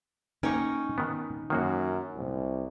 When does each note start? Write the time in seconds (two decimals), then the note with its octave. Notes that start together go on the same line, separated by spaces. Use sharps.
0.43 A#3 C#4 D#4 A#4 D#5 G5 C#6
0.98 D#3 B3
1.50 F#2 D#3 A#3 F#4
2.15 C2